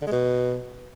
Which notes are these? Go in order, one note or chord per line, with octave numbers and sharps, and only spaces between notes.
D3
G#3
B2